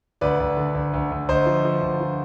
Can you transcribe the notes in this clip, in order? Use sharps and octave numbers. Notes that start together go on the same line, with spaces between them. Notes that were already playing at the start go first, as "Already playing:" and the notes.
D2 B4 D5
D2
D3
D2
D2
D2
D2 C5 D#5
F3
F3
D2
F3